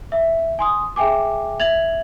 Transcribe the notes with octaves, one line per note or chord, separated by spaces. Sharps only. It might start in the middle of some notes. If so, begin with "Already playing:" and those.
E5
G#5 C6 D#6
G#4 E5 G5 G#5 D6
E5 G#6 A6 F7 F#7